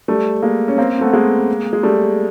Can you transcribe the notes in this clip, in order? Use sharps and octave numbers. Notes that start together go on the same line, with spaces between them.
G3 A3
G#3 A#3
C#4
A#3 C4
C4
A3 B3
G#3 A#3
G#3
G3 A3